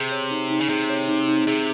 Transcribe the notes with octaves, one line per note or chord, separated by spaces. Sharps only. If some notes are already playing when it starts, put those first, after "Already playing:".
Already playing: C3 G#4
C#5
D#4
D#4
C#3
C3 G#4
C#5
D#4
D#4
C3 G#4